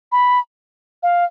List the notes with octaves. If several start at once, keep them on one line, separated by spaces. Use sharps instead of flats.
B5
F5